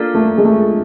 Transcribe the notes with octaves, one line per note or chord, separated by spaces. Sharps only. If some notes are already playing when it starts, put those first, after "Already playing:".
Already playing: A#3 D4 F4 A4
A3
G#3
A3